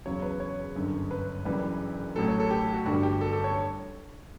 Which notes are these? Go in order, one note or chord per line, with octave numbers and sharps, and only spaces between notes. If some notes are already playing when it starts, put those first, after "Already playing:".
E2 C#3 F#3 C#5
B4
C#5
G1 F#2 D3
B4
F#1 F#2 E3 G3 B4
A1 A2 F#3 A4
C#5
A4
G4
G4
F#4
G1 G2 D3 G3 F#4
G4
A4
A4
C#5